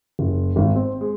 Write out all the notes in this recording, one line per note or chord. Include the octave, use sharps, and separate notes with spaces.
F#1
G#1
C4
G#3